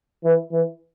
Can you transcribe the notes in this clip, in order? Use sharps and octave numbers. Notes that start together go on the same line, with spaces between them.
E3
E3